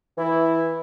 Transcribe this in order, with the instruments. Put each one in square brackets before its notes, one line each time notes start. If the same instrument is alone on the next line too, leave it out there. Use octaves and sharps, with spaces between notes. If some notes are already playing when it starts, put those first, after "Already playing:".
[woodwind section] E3 [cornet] E4